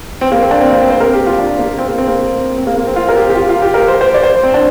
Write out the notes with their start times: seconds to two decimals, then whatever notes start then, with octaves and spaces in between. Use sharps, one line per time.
0.21 C4
0.32 A#3
0.42 C4
0.51 D4
0.61 C4
0.71 A#3
0.81 C4
0.90 C5
1.00 A#4
1.14 G4
1.26 F4
1.39 D4
1.59 A#3
1.78 C4
1.88 A#3
1.98 C4
2.08 A#3
2.58 C4
2.67 A#3
2.77 A#3
2.86 C4
2.96 F4
3.09 A#4
3.16 G4
3.30 G4
3.35 F4
3.49 F4
3.62 G4
3.74 A#4
3.88 C5
4.01 C5
4.14 D5
4.23 C5
4.43 C4
4.54 D4